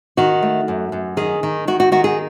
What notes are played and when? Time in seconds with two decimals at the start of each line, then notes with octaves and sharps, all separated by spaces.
0.17 D#3 F#4
0.42 A3
0.68 F#2
0.92 F#2
1.17 D#3 G#4
1.43 D#3
1.67 D#3 F#4
1.80 F#4
1.92 D#3 F#4
2.04 G#4